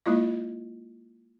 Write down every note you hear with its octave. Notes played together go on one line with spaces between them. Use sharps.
G#3 A#3 E4 F4 D#5